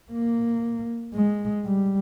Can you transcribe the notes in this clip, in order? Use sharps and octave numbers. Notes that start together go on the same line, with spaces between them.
A#3
G#3
G3